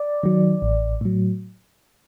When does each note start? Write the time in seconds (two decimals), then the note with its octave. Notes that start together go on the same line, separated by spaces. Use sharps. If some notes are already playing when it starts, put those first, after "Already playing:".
Already playing: D5
0.23 D#3 F#3
0.62 A1
1.01 A2 F#3